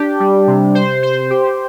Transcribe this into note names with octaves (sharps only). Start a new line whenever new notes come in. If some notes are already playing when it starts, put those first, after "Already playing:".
Already playing: D4 G4
G3
C3
C5
C5
G4